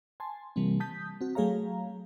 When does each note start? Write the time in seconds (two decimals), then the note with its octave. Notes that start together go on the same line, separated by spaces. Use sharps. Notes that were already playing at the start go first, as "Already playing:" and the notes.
0.20 G#5 A5 C6
0.56 C3 E3 G3 A#3 C4
0.80 A5 D#6 G6 B6
1.21 C4 F#4
1.35 F#3 A3 G#4 C#5 F5 A#5